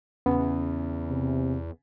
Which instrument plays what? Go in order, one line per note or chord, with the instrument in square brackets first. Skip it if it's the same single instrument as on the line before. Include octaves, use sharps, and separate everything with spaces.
[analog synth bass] E2 [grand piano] C#3 [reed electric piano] B3
[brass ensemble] C3